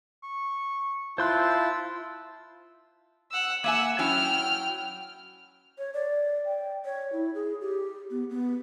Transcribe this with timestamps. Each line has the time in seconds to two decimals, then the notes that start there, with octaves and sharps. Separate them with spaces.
0.23 C#6
1.18 E4 F4 C5 A5 C6 E6 F#6
3.31 F#5 E6
3.64 A#3 E5 F#5 G#5 E6
3.99 F#3 C#4 E4 G5 F6
5.78 C#5
5.94 D5
6.46 G5
6.85 C#5
7.12 E4
7.35 G#4
7.61 G4
8.11 B3
8.30 B3